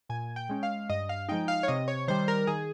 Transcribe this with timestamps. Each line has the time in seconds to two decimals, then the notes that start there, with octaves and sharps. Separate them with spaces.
0.09 A#2 G#5
0.36 G5
0.49 G#3 C#4
0.63 F5
0.89 G2 D#5
1.09 F5
1.29 F3 G#3 D#4 G5
1.48 F5
1.63 C#5
1.68 C3 D#5
1.88 C#5
2.08 D#3 G3 C5
2.28 A#4
2.47 D#3 G#4